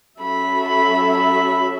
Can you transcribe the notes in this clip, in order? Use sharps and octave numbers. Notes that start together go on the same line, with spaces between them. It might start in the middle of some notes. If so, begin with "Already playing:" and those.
F#3 C#4 F#4 A4 E5 B5
B5
B5